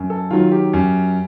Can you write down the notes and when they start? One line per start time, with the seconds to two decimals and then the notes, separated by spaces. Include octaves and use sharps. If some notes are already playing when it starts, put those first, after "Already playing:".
Already playing: F#2
0.10 A4
0.31 D#3 F#3 F4
0.52 G4
0.74 F#2